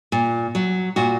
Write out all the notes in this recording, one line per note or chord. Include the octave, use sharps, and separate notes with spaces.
A#2
F#3
A#2 F#4